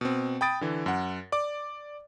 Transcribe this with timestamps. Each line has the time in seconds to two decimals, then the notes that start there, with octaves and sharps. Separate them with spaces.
0.01 B2 C4
0.41 G5 B5 D#6 A6 D7
0.61 D3 E3
0.86 F#2 F#5
1.32 D5 D6